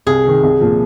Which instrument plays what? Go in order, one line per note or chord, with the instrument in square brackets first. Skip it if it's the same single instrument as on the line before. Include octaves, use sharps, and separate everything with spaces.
[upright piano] C2 [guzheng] G#4
[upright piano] C3 D#3
C2
A#2 F3